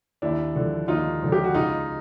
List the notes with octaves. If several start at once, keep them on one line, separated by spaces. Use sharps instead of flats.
D#2 D4 E4
D3 F3
D#2 D#4 F4
D3 F3
G4
F#4
C#2 D#4 F4